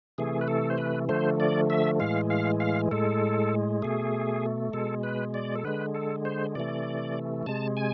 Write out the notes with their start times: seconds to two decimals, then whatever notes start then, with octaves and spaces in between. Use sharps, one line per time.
0.18 C3 E3 A3 G#4
0.41 B4
0.48 A4
0.70 C5
0.78 B4
1.09 D3 F3 A3 C5
1.40 D5
1.70 E5
2.00 A2 E3 G#3 F5
2.30 F5
2.60 F5
2.91 A2 G#3 A4
3.82 B2 A3 G#4
4.73 B2 G#3 A4
5.03 B4
5.34 D5
5.56 A4
5.65 D3 G#3 B4
5.95 A4
6.25 C5
6.55 C3 E3 A3 D5
7.46 C3 G#3 A5
7.77 G#5